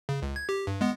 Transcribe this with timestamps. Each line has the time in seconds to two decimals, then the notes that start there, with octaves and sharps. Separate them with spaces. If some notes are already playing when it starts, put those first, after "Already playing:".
0.09 C#3
0.22 C#2
0.36 G#6
0.49 G4
0.67 G2
0.81 G#3 B3